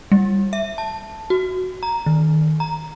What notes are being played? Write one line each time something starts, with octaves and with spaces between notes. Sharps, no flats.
G3
E5
A5
F#4
A#5
D#3
A#5